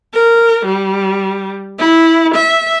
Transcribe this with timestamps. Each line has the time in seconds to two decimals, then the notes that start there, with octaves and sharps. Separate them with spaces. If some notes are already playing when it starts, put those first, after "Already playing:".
0.14 A#4
0.66 G3
1.79 E4
2.35 E5